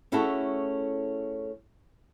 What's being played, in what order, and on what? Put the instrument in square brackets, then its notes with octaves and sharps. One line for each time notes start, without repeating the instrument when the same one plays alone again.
[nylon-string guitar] A3 C#4 E4 F#4 G#4 A4